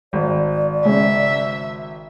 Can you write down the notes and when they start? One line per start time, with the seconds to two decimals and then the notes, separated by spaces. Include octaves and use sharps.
0.13 G#1 D5
0.85 C#3 G#3 C#4 E5